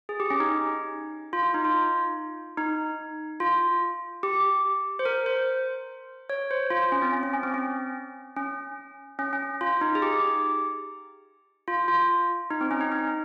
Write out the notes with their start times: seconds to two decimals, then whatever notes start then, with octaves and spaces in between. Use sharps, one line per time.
0.09 G#4
0.20 G4
0.30 C#4
0.40 D#4
1.33 F4
1.43 F4
1.54 D#4
1.65 F4
2.58 D#4
3.40 F4
4.23 G4
4.99 C5
5.05 A#4
5.26 C5
6.30 C#5
6.51 C5
6.70 F4
6.92 C#4
7.02 C4
7.13 C#4
7.23 C#4
7.33 C#4
7.43 C4
7.54 C#4
8.36 C#4
9.19 C#4
9.33 C#4
9.61 F4
9.81 D#4
9.95 G#4
10.02 G4
11.68 F4
11.88 F4
12.51 D#4
12.61 C4
12.71 C#4
12.81 D#4
12.92 D#4